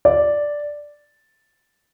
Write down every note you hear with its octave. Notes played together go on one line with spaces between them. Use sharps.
D5